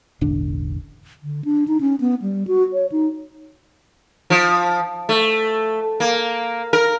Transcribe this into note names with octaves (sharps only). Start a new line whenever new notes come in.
E1 A1 D3 D4
D3
D4
D#4
C#4
B3
G3
F#4
C#5
D#4
F3
A3
A#3
A#4